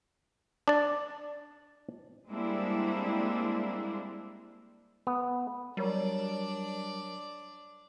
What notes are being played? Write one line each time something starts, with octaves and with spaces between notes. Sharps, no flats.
D4 D5
G3 G#3 A#3 C4 D4 E4
B3
F#3 G3 D4 A#4 C#5 D5